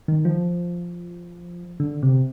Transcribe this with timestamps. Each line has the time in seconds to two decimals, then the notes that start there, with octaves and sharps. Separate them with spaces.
0.08 D#3
0.25 F3
1.80 D3
2.03 C3